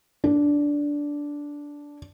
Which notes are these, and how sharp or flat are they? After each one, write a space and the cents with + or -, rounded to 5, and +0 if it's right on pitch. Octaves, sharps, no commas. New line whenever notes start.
D4 -10